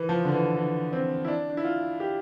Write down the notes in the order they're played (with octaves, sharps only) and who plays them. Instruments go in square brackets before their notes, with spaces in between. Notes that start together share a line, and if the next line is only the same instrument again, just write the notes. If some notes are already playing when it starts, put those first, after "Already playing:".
Already playing: [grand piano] E3
F3
D3
E3
E3
C4
E4
D4
D4
E4
F4
G4